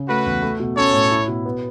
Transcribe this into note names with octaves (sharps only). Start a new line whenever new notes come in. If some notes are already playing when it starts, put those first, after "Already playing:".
Already playing: C#3
A3 F#4 B4
E2
A3
B2
C#4 A4 C#5
A2
E4
B2
B3